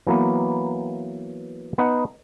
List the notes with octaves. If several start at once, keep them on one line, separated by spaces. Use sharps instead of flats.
E3 F#3 A#3 B3
B3 D#4 F#5